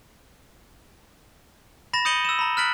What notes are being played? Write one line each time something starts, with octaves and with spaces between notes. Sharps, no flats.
B5 A6 A#6 E7
D#6 G6 C#7 D#7 F#7 G7
E6 E7
A#5 B5
F6 F#6 A6 B6 D7 F#7